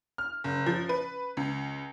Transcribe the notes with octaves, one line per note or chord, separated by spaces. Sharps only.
F6
F#1
F3
B4
C#2